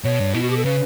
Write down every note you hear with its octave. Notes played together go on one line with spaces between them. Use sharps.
B2 C#5
G2
B2 E4
F#4
G4
A4
C#3 B4